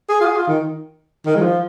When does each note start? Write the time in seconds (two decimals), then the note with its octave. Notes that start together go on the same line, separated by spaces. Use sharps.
0.09 G#4
0.20 F4
0.26 G#4
0.37 F4
0.47 D#3
1.26 D#3
1.35 G#3
1.41 F3